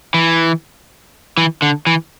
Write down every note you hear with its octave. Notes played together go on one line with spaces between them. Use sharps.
E3
E3
D3
E3